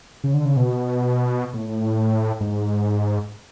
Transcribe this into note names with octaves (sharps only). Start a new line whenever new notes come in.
C#3
D3
C#3
B2
A2
G#2